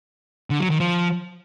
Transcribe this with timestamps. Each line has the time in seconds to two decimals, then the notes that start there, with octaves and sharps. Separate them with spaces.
0.50 D3
0.60 F#3
0.70 D#3
0.80 F3